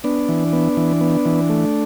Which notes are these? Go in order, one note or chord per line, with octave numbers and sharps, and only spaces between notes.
B3 D4
E3
B3
E3
B3
E3
A3